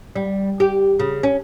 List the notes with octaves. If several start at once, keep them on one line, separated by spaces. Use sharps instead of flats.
G3
G4
C#3
C#4